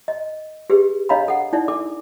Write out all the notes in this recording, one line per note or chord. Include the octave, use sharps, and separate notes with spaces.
D#5
G4 G#4 B4
D4 C#5 D#5 F5 A#5 B5
A4 F#5
D#4 E4 D5
D4 A4 D6